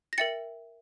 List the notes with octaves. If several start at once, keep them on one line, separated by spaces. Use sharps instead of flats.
A#6
A#4 E5 G5 A6 C#7